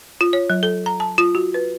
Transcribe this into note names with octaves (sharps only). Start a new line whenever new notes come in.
F4
C#5
F#3
A4
A#5
A5
F4
F#4
B4